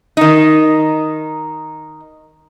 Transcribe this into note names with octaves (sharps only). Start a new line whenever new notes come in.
D#3 D#4